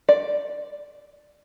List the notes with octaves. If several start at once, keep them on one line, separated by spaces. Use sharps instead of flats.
D5